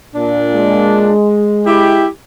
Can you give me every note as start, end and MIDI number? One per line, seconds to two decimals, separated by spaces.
0.15 1.12 46
0.15 1.12 62
0.55 2.04 56
1.66 2.07 64
1.66 2.07 67